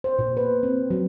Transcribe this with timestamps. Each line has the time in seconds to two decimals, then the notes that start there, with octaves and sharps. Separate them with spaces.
0.04 C5
0.19 A#2
0.37 B4
0.63 C4
0.90 F#3